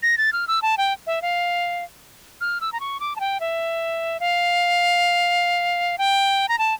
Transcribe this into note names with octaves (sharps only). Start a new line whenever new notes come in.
A#6
A6
F6
E6
A5
G5
E5
F5
F6
E6
A#5
C#6
D6
A5
G5
E5
F5
G5
A#5
A5